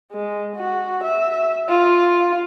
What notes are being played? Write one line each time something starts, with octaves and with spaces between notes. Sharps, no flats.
G#3
F#4
E5
F4